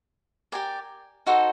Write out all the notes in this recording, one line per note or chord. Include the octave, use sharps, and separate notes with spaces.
G4 A#4 D5 G#5
D#4 F#4 A4 C5